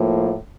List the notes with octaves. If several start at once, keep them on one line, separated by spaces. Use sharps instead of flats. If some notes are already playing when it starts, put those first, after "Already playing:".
Already playing: A2 F3 A#3